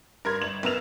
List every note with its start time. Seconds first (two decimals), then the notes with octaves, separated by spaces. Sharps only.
0.25 G2 A#4 C6 G#6
0.42 G1 E7 F#7
0.63 B1 B3 A#4 E6 E7 F7